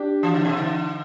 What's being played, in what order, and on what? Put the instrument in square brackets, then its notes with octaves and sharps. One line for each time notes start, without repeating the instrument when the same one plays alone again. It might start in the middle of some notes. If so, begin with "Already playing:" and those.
Already playing: [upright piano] D4 G4
[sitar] E3
D3
B2
D3